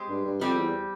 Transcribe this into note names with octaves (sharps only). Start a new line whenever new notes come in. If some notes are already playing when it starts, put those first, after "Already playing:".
Already playing: G#3 C4 G4
G2
G2
F2 G3 C4 G4
E2